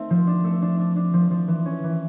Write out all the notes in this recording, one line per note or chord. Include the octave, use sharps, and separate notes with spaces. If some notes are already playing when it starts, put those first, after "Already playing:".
Already playing: A3 C4 D#4
F3
D4
A3
D4
D4
D4
F3
F3
E3
C#4
E3